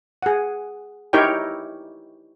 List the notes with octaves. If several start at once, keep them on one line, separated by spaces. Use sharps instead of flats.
G#4 F#5
D#4 E4 G4 A#4 C#5 G5